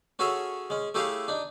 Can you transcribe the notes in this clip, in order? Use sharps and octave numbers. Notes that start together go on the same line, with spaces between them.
C#4 F#4 G#4 A4 C#5 E5
G#3 C#4
A3 E4 G4 G#4 C#5 F5
D4 D#4